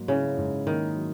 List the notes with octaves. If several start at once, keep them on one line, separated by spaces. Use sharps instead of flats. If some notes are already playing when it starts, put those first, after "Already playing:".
Already playing: G#2 F#3 A#3
C#3 E4
G#2
D#3 A#3
F#3